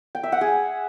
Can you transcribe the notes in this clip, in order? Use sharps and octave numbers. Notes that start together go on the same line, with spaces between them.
G5
E5
F#5
G#4